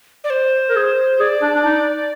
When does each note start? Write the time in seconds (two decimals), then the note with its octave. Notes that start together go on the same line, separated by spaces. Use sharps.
0.24 D5
0.30 C5
0.69 A#4
0.76 G#4
1.20 G#4 D5
1.41 D4
1.54 D4
1.65 D#4